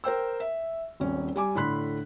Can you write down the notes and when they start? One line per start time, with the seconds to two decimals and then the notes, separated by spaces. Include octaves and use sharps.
0.04 A#4 C5 G5 E6
0.40 E5
1.00 D#1 G#1 C#4
1.36 G3 G#5 D6
1.55 A2 D3 B5 C6 F#6 B6